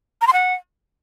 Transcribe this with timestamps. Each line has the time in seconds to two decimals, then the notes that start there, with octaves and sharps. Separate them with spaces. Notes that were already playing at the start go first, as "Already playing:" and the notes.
0.21 A#5
0.27 C6
0.33 F#5